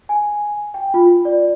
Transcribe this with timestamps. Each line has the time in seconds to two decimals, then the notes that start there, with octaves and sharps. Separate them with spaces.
0.09 G#5
0.74 G5
0.94 F4
1.25 D5